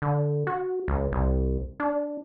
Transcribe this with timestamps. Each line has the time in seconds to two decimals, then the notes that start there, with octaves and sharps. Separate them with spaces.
0.02 D3
0.47 F#4
0.88 C#2
1.12 C2
1.80 D4